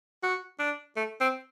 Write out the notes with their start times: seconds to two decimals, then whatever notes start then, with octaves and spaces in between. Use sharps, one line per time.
0.23 F#4
0.59 D4
0.96 A3
1.20 C4